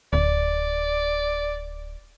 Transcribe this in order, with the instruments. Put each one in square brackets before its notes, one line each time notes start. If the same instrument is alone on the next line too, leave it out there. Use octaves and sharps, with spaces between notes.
[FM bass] D1 [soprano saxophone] D5